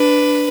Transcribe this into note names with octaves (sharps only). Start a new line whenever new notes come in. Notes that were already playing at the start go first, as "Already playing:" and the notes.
Already playing: D4 B4